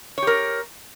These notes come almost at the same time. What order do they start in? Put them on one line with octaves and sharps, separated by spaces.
C#5 G4 A#4